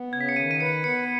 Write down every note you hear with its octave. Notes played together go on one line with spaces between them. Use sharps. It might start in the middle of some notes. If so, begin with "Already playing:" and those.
Already playing: B3
C#3 G#6
B6
C#7
D#3 D#7
D#7
B4 C#7
B3 C#7